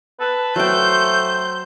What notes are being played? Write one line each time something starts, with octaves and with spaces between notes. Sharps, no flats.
B4 A5
F#3 A3 C5 G5 G6